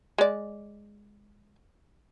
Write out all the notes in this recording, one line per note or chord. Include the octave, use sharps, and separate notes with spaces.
G#3 D5